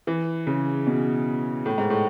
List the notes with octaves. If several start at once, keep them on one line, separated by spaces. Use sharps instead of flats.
E3
C#3
B2
A2
G#2
A2